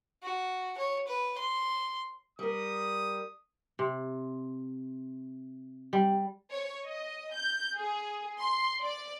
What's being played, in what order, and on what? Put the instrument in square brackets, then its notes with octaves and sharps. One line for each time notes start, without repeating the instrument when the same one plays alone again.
[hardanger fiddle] F#4
C#5
B4
C6
[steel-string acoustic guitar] G3 A#4 [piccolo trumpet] D#6
[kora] C3
G3
[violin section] C#5
D#5
G6
G#4
C6
D5